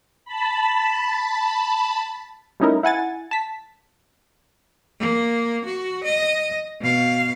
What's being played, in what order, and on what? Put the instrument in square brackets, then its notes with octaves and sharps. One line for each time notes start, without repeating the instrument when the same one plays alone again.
[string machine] A5 B5
[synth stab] G3 A3 C#4 D#4 E4 A#4
E4 F#5 G#5 A6
A5 B6
[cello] A#3
F#4
D#5
B2 F5